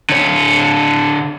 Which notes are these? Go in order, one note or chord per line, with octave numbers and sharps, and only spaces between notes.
D3 C#5